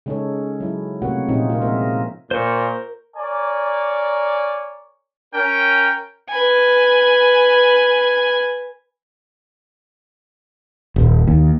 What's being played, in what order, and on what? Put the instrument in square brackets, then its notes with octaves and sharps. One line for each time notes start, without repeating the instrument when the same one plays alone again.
[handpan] C#3 G#3 C#4 D#4 A4 C#5
F#3 E4
C3 A3 A#3 F#4 C#5 F#5
A#2 F3 C4 C#4 D#4 F4
A#3 F4
F3 G#3 C4 A#4 D#5 E5
[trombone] A#2 [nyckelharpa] A#4 [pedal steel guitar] C5 C#6
[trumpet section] A#4 C#5 D5 G#5
[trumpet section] C#4 A#4 [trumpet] G5
[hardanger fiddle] B4 G#5
[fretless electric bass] D#1
D#2